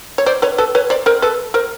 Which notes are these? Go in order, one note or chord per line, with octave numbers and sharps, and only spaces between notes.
C#5
C5 D5
B4 C#5
A4 B4
B4 C#5
C5 D5
A#4 C5
A4 B4
A#4 C5